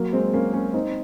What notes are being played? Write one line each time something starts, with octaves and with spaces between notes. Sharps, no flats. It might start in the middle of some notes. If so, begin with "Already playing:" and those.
Already playing: F#3 A#3
G#3 C4
A#3 C#4
A#3 C#4
C4 D#4